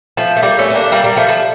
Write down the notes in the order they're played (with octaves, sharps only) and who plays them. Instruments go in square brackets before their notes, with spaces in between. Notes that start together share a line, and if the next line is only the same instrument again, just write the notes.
[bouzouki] F3 A3
A3
G3 A#3
A3 C#4
C#4
A#3 D4
A3
G3 A#3
G3 A#3
F3 A3
F3 A3